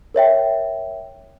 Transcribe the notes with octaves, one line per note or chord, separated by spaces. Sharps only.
A#4 C#5 E5 G5